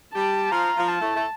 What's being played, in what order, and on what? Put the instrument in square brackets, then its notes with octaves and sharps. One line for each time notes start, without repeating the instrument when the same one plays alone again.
[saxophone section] G3 G4 [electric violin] A5
[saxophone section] F3 F4 [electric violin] A#5
[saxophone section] F3 F4
[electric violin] A5
[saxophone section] A2 A3
A3